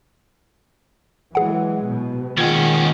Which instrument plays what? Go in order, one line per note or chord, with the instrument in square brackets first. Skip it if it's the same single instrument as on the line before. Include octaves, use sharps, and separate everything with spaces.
[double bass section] E3 F#3 G#3 [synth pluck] G#4 F#5
[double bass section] B2
[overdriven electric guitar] D#2 C#4 [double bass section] D#3 G#3 [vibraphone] F4 F#5 G5 [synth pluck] G#6